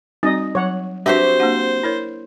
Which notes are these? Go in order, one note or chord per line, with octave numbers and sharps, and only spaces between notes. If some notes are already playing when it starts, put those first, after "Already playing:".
G3 C4 D#4 F#4 D#5
F#3 C#5 F#5
C4 D4 F#4 G4 B4 C5 E5
A#3 D4 F#5
E4 A#4 C#5